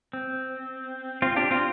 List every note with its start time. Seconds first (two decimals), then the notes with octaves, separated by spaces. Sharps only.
0.13 C4
1.22 C4 F4
1.36 D4 G4
1.51 C4 F4